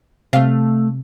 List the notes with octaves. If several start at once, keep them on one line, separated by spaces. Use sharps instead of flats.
C3 A3 F5